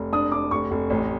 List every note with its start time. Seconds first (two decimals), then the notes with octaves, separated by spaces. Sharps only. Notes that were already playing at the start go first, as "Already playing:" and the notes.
Already playing: F1
0.13 D4 D#6
0.32 D4 D6
0.51 F1 C#6
0.71 F1
0.90 A1